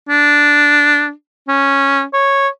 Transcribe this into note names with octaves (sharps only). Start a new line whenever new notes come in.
D4
C#4
C#5